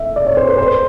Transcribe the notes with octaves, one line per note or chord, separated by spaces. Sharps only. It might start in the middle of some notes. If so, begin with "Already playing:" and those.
Already playing: E5
D5
C#5
C5
B4
C5